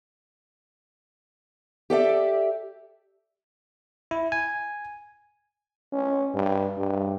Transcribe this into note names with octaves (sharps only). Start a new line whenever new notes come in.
G4 A4 D5 E5
E4
G#5
C#4
G2
G2